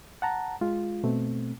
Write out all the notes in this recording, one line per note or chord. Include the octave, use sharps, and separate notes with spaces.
F#5 A5 A#5
G#3 F4
B2 A3 C4